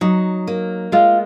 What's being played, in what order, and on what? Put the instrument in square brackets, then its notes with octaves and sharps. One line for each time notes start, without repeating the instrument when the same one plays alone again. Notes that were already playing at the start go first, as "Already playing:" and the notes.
[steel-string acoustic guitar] F#3 [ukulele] D#4
[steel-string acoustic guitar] A#3
[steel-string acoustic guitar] G#3 [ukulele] F4